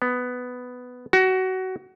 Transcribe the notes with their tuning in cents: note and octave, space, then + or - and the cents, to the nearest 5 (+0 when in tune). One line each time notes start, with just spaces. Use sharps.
B3 +10
F#4 +20